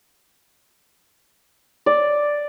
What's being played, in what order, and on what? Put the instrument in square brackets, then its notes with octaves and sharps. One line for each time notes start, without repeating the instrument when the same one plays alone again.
[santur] D5